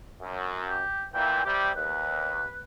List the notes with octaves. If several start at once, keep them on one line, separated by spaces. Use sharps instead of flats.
F#2
G4
A#2 E3 G5
C3 G3 G4
D#2 B4